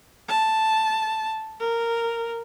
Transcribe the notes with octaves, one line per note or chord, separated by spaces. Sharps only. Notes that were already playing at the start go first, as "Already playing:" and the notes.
A5
A#4